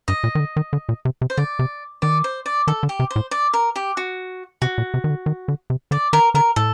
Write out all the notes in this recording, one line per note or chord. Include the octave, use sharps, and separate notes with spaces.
G2 D#5
A#2
D#3
D3
D#3
D3
A#2
C3
C3
C5
D3 D5
C3
D#3 D5
C5
D5
D#3 A4
D3
G4
C3
C5
A2
D5
A#4
G4
F#4
C3 F#4
A#2
C3
D#3
D3
D#3
D3
C3
D3 D5
D#3 A#4
D3 A#4
A2 A4